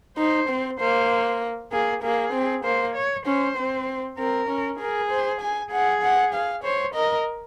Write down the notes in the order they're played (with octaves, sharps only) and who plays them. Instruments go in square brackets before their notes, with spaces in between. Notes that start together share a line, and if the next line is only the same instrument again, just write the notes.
[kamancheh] D#4 [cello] C5
[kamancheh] C4
[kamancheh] A#3 [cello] C5
[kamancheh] A#3 [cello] G#4
[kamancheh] A#3 [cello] G#4
[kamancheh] C4
[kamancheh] A#3 [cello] C5
[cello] C#5
[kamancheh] C#4 [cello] C5
[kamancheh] C4
[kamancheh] C4 [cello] A#4
[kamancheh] C#4
[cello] G#4 [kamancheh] A#4
[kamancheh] C5
G#5
[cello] G#4 [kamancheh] F#5
[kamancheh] F#5
F5
[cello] C5 [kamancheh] C#5
[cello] A#4 [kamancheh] D#5